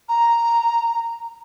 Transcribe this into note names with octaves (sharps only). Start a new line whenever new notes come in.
A#5